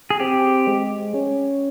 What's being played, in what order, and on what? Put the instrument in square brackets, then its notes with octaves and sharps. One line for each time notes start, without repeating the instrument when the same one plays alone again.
[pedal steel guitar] G#4
[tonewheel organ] C4 [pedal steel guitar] G4
[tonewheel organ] G#3
C#4